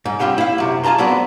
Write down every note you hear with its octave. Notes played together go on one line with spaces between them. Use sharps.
G#2
G2 C4 F4 G4 F#5
E4 F5
F#2 C3
F4 G#4 A5 A#5 C6
F#3 G#3 B3 C4 F#4 D5